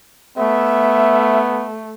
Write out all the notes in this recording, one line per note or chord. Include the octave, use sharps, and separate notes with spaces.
A3 B3 E5